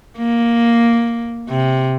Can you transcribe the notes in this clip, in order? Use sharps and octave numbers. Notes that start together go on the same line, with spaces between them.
A#3
C3